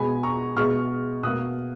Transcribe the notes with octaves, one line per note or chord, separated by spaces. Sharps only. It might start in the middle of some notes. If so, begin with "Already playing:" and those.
Already playing: B2 G#3 G#5 B5
A#5 C#6
B2 G#3 C#6 F6
B2 A#3 D#6 F#6